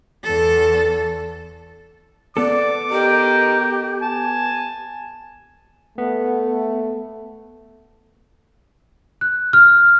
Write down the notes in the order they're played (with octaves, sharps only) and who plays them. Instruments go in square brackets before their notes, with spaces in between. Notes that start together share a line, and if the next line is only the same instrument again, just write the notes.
[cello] E2 A4
[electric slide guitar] B3 A4 [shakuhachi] D5 [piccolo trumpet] D6
[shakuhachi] G4 [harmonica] A#4 D#5
[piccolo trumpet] G#5 [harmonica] A5
[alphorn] A3 [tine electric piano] B3
[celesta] F#6
F6